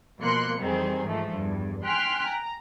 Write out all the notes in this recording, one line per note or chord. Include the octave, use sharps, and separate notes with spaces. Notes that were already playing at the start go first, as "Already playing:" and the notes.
B2 F3 A#3 C6 F#6 C#7
F2 D#3 E3 G3 C4 G#4
G#2 E3 F3 A3
E2 G2
G5 G#5 C6 F6 F#6 B6
A#5